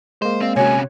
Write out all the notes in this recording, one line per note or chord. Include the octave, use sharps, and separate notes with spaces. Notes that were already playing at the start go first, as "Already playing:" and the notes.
G#3 A#3 C5
C4 D5 F5
C3 C#4 F#4 C#5 G#5